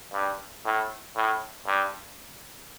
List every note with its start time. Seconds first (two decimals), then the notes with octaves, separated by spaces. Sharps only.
0.13 G2
0.65 A2
1.16 A2
1.66 G2